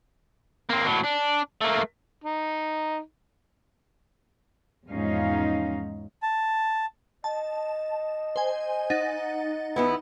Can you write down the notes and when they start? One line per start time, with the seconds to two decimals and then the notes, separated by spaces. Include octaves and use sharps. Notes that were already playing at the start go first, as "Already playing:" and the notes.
0.70 A#3 C4
0.86 A2 F#3
1.05 D4
1.61 A3 A#3
2.24 D#4
4.89 E2 G#2 F3 C#4 D#4 F5
6.22 A5
7.24 D#5 A5
8.36 C5 G#5
8.90 D#4 F#5 A6
9.76 E2 B3 E4